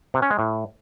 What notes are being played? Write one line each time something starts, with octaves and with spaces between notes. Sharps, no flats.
C3
C#4
G#3
A2